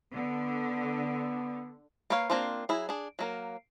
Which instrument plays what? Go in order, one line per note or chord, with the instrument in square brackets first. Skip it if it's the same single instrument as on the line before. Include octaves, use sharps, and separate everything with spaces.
[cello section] D3 [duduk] B3
[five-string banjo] A#3 A#4 B4 C#5 F5
A#3 C4 D4 F4 C5
F#3 E4 G#4
D4 G#4
F#3 A#3 A#4